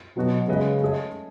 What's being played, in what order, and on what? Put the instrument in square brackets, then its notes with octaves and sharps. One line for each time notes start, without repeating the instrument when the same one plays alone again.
[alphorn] B2 [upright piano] F#3 B3 F#4
[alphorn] C#3 [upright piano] G#3 C#4 G#4 B4 D#5
[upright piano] A3 C#4 G#4 D#5